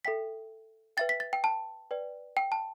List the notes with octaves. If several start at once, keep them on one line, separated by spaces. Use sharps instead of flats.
A4 E5 G5 B6
B4 E5 G5 A6
B6
A6
G5
A5
B4 D5 G5
G5
A5